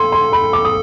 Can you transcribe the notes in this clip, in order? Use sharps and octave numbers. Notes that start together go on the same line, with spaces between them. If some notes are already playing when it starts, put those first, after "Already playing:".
Already playing: A4 C6
C6
B5
D6
D#6